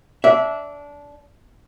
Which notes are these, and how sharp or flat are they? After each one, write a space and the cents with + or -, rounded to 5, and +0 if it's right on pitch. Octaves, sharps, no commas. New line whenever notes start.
D4 -20 E5 -10